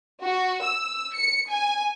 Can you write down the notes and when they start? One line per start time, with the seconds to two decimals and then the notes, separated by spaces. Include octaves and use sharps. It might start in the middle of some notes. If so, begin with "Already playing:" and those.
0.23 F#4
0.63 E6
1.15 C#7
1.49 G#5